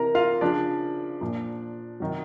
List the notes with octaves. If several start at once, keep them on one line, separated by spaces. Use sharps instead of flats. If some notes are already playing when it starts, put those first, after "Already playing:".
Already playing: C3 E3 A#4 A#5
F4 F5
C#3 F3 D4 D5
A#2 F3
C3 D#3 F#3